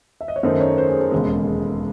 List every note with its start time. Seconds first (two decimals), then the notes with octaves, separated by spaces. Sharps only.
0.21 E5
0.28 D#5
0.36 C#5
0.43 F#2 D#3 A3 D#4 C5
0.61 C#5
0.78 C5
0.88 G#4
1.00 A4
1.11 E1 D#2 C#3 G#3